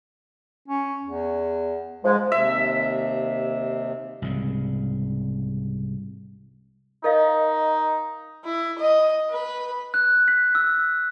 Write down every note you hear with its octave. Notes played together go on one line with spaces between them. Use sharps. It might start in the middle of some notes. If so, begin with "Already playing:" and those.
C#4
E2
G#2 F3 G#3
D#2 C3 E5
C2 G#2 C#3
D#4 A#4 D#5 F5
E4
D#5
B4
F#6
B6
E6